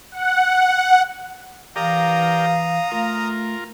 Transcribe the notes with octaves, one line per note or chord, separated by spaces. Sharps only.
F#5
E3 G4 A#4 D5 F5 A#5 D#6
A3 F4 A#4